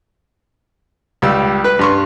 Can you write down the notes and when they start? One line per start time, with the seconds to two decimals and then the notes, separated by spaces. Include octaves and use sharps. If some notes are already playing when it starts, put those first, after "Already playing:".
1.22 C#2 G3 E6
1.64 B4
1.79 G2 C6 C#6